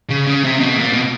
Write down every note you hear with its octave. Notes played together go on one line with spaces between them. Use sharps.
C#3
C#3
C3
B2
A#2
B2